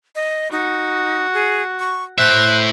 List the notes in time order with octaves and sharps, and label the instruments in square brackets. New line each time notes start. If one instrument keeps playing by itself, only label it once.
[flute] D#5
[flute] D#4 [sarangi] F#4
[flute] G#4
C#6
[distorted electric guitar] A2 E5 [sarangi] C5 [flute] F#6